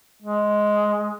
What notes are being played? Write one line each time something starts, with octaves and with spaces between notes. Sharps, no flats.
G#3